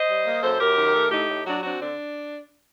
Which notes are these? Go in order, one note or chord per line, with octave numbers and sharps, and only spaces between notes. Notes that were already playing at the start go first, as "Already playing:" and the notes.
Already playing: C5 D#5
G3
A#3
F#2 A4 C5
F#2 G4 A#4
D#3
A3
A2 D#4 G4
A2
F#3 D4 F#4
C4 D4 F#4
D3 D4